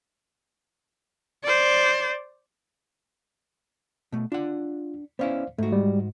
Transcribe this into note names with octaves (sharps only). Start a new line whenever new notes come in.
C5 D5
B2 A3
D4 F4 F#5
B3 C#4 E4 C5 D5 F5
G#2 A3 F#4
G3 G#3